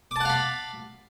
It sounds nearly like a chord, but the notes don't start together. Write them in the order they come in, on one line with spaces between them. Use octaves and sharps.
D6 A5 F#5 F5 B5